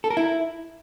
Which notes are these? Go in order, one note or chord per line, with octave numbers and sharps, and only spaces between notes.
A4
A#4
E4